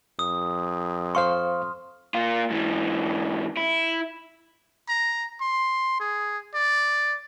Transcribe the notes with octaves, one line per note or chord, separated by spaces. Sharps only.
F2 D#6
C5 F5 C6 C#6 F6
A#3 F4
G#2 E3
E4
A#5
C6
G#4
D5